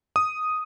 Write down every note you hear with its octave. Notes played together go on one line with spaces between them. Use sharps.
D#6